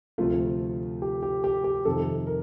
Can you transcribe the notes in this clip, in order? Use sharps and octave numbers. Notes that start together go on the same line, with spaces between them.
D2 C3 F3 A3 F4
G4
G4
G4
G4
F2 C3 D#3 A4
A#4